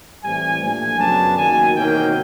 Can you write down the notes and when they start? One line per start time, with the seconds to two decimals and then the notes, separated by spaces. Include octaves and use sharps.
0.23 A2 E3 G3 C4 G#5
0.62 A#2 F3 A3 D4 G#5
0.99 F#2 C#3 F#3 B3 D4 A5
1.37 D#2 D#3 F#3 G#5
1.74 E2 C3 D#3 F#3 A#3 G5